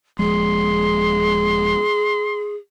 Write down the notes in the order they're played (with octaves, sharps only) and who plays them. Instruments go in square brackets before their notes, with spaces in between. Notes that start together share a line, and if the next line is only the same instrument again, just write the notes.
[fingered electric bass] D#1 F3 G#3 [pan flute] G#4 [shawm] C6